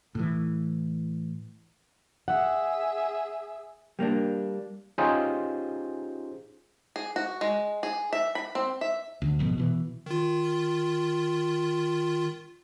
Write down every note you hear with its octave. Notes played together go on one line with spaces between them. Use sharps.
A2 E3
G#4 E5 F#5
G3 A#3 C4 D4
C#4 D#4 F4 G4 G#4 C5
G#4
F#4
G#3
G#4
E5
B5
C4
E5
D2
G#1 F2 B2
B2 E3
D#3 F4